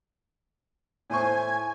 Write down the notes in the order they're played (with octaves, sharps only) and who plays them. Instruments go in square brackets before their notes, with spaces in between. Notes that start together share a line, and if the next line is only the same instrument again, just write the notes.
[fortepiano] A2 C5 C#6 [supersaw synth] G#5